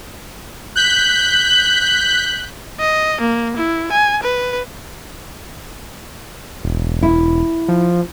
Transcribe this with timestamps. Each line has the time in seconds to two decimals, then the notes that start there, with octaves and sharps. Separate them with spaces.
0.76 F#6 G6 B6 F#7
2.80 D#5
3.21 A#3
3.57 E4
3.92 G#5
4.23 B4
6.63 E1
7.03 E4
7.68 F3